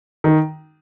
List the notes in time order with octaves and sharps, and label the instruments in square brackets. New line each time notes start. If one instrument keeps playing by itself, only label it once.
[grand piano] D#3